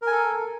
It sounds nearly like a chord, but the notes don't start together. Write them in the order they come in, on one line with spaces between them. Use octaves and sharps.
A#4 G#5 A4